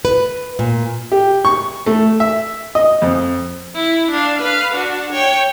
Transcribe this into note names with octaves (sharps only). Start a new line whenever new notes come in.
B4
A#2
G4
C#6
A3
E5
D#5
F2
E4
D4 F5
B4 F5
D4 F#4
C#5 G5